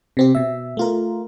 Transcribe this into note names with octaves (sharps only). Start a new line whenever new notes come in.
C3 C4 G4
B2 E5
A3 F4 A#4